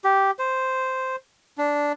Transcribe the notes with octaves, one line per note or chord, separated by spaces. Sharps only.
G4
C5
D4